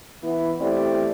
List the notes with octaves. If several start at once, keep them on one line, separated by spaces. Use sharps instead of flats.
E3 B3
E2 A3 C4 E4 G4 D5